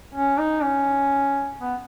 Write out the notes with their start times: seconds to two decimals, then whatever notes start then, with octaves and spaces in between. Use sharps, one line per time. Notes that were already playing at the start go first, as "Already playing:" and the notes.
0.15 C#4
0.38 D#4
0.63 C#4
1.60 B3